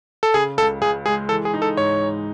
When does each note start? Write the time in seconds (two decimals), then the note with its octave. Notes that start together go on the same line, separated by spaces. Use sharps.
0.23 A4
0.34 C#3 G#4
0.58 C#2 A4
0.82 C#2 G#4
1.06 G#3 G#4
1.29 E3 A4
1.45 G#4
1.54 D#4
1.62 A4
1.77 G#2 C#5